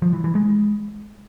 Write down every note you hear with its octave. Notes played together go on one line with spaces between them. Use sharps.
F3
E3
E3
G#3